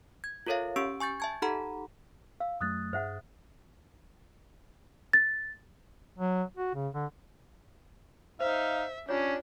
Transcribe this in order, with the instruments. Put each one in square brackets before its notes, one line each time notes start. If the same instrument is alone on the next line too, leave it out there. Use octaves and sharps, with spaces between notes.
[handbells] G#6
F4 A4 A#4 C#5 E5 F5
C#4 G4 C#6 E6 D7
G#5 C#6 G6 A6
E5 A5 G#6
D#4 G4 A4 F#5 A#5 B5
[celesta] F5 [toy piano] E6
[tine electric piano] F#2 F#3 A3 [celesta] D#6 F#6 A6
[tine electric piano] G2 G#4 [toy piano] C5 E5 F#5
[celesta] A6
[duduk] F#3
F#4
C#3
D3
[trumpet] D#4 [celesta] C5 [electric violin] E5 [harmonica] F5
[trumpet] C#4 [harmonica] D4 [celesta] F4 C#5 [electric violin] G4